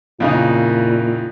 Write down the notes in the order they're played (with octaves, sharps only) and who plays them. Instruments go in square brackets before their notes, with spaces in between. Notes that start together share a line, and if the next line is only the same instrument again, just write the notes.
[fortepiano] F2 C#3 D#4 [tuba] A#2 [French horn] E4